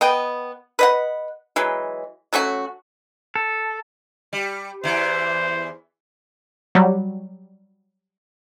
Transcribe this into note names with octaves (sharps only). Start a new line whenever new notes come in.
B3 D#5 G5
B4 D#5 F#5
E3 F#3 G#3
F#3 A3 C#4 F#4
A4
G3
E2 E3 C5
F#3 G3